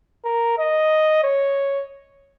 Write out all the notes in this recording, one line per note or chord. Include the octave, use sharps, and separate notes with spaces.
A#4
D#5
C#5